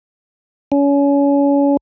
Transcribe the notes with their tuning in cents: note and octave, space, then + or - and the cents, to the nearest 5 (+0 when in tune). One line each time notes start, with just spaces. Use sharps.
C#4 +30